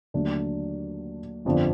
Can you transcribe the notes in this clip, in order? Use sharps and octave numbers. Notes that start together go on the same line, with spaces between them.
D#2 D3 F#3 A3 D4
G1 F2 D3 F3